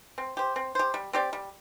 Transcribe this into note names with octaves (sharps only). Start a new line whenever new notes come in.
C4
G4 C5
C4
G4 C5
G3
C4 G4 D5
G3